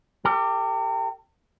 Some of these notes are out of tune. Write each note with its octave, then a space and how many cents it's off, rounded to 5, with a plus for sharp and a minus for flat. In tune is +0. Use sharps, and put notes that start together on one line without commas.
G4 +0 A#4 -45